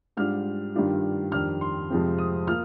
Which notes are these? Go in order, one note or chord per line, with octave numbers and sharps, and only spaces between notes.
G#2 G3 D4 F4 F6
G2 D#3 G3 D4 F4
F2 D#3 G3 D4 F6
C6
F2 C3 F3 G#3 C4
D#6
A#3 F4 F6